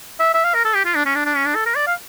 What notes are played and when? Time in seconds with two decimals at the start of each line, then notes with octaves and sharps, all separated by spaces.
0.20 E5
0.34 E5
0.44 F5
0.54 A#4
0.65 A4
0.74 G4
0.85 F4
0.95 D4
1.06 C#4
1.15 D4
1.26 D4
1.36 C#4
1.45 D4
1.55 A4
1.66 A#4
1.76 D5
1.87 F5